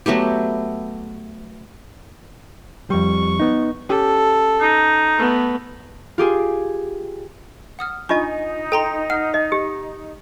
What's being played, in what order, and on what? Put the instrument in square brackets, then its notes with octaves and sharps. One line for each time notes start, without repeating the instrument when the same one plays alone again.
[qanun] F#3 A3 B3 G4
[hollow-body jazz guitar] F2 G3 [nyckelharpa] C#6
[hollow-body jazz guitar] B3 D#4
[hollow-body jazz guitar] C#4 G4 [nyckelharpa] A4
[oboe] D#4
[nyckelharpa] A3 B3
[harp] F4 G4 G#4 G#5
[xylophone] F#5 D#6 F6
[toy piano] D4 F4 D#5 [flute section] D#4 [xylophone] G#5 C#6
[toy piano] A4 [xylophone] G5 A#5 C6
[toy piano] F#5 [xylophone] F6
[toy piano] D#5
G4